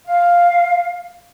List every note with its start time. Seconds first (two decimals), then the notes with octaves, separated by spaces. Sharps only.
0.07 F5